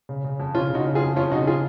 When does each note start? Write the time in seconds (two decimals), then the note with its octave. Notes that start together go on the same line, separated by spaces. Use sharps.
0.09 C#3
0.24 C#3
0.40 F2
0.54 C#3 C#4 F4
0.70 C#3 D#4 F#4
0.85 C#3
0.95 F4 G#4
1.01 F2
1.16 F2 C#4 F4
1.31 C#3 D#4 F#4
1.47 F4 G#4